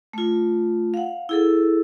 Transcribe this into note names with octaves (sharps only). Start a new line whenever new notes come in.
A3 F4
F5 F#5
E4 G#4 A4